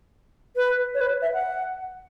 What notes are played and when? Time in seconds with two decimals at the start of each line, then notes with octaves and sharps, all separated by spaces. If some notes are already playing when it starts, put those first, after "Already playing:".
0.56 B4
0.95 C#5
1.01 B4
1.22 E5
1.34 F#5